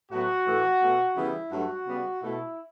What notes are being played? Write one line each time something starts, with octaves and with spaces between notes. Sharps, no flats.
A2 F#3 B3 F#4
A2 E3 A3
B2 A3
C#3 E3 G3 B3 E4
G2 F#3 A3 F#4
C#3 G3 B3
B2 A3 E4